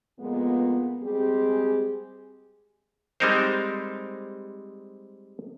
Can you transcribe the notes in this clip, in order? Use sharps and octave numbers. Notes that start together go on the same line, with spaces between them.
F2 A#2 G#3 B3
G3 G#3 C4 G4 G#4
G3 G#3 C4 D#4 A#4 C5